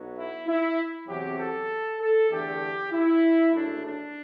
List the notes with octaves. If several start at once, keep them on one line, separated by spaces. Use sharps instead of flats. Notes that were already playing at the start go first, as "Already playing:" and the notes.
Already playing: B1 B2 F#3 B3
E4
E4
E2 C3 F#3 G4
A4
A4
E2 D3 A3 G4
E4
F#1 F#2 D3 A3 D4
D4